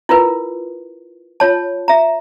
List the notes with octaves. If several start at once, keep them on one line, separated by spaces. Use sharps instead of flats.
E4 F4 A#4 B4
F4 C#5 A5
E5 A#5